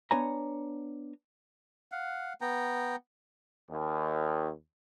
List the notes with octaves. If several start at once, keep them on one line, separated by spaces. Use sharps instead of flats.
B3 D4 C#5 G#5 A#5
F5 F#5
B3 G5 A#5
D#2